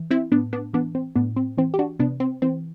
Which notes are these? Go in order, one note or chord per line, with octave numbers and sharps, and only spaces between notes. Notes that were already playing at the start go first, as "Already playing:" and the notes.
Already playing: E3
C4 E4
A2 B3 D4
B3 D4
E3 B3 D4
C4
A2 B3 D4
C4
E3 C4
G4
D4 F#4
C3 B3 D4
C4
E3 C4